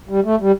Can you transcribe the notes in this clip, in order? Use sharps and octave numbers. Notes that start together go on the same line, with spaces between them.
G3
A3
G3